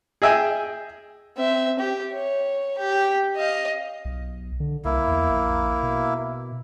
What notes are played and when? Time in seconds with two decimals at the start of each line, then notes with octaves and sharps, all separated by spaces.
0.22 G#4 D#5 E5 G5 G#5
1.37 C4 E5
1.79 G4
2.13 C#5
2.78 G4
3.36 D#5 F5
4.05 B1
4.60 D3
4.85 C2 A#3 E4
5.08 E2
5.29 A#1
5.83 B2